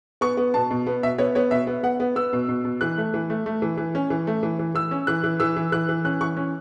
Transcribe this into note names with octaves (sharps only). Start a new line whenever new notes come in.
B3 C#6
B3
B2 A5
B2
B3
B2 E5
B3 C#5
B3 C#5
B2 E5
B3
B3 F#5
B3
B3 E6
B2
B2
B2
E3 F#6
A3
E3
A3
A3
E3
E3
C#4
E3
A3
E3
E3
E3 E6
C#4
E3 F#6
E3
E3 E6
E3
E3 F#6
E3
C#4 F#6
E3 C#6
C#4